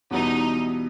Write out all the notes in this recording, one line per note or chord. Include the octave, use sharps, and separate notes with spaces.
E2 B2 G3 B3 D#4 E4